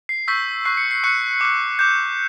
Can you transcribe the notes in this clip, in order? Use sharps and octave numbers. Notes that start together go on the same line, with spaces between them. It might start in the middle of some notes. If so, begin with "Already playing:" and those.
C7
C#6 E6 G6 B6
C#6 F#6 C7
C#7
C7
C#6 F#6 C#7
D6 F#6
D6 G6